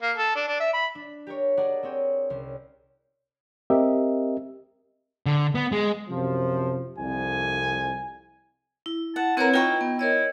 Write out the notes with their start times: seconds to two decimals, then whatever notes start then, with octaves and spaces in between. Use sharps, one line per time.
0.02 A#3
0.17 A4
0.35 D4
0.48 D4
0.60 E5
0.73 B5
0.95 D4
1.27 G4 A#4 C#5
1.57 G#4 A#4 D5 F#5 A5
1.83 C4 G#4 C#5 G5
2.30 C2 C#4 C7
3.70 C4 G4 A#4 D#5 E5
5.26 D3
5.55 B3
5.72 G#3
6.09 F#2 C3 F3
6.98 C2 F2 G#5
8.86 E4
9.16 F#5 A5
9.37 C4 E4 A#4 B4 C#5 F#5
9.54 D#4 F4 G5 C#6
9.81 B3
9.99 E4 A#4 C#5 D#5